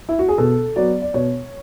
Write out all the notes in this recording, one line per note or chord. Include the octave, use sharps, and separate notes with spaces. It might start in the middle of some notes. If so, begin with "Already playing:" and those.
E4
F#4
G#4
B2 A4
F#3 B3 D5
D5
B2 C#5